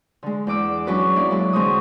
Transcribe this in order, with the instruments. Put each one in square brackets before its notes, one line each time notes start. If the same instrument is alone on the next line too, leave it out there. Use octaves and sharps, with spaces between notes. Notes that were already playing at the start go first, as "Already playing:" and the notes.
[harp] D3 G#3
E2 B3 D6 E6
F#3 C#4 D4 F#4 B4 D5
A#3 D4 E4 D5
F#3 G#3 B4
E2 D3 G#3 C4 C#6 D#6